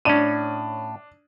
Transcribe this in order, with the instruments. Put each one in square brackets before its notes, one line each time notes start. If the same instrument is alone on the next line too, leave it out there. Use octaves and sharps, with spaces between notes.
[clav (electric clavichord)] A2 C#4 [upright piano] D4 D#7